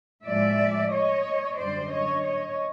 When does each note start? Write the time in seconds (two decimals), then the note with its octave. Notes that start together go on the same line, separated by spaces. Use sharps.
0.25 A2 F3 G#3 D5 E5
0.91 C#5 D#5
1.57 F#2 D3 G3 C5 D5
1.90 C#5 D#5
2.23 C#5 D#5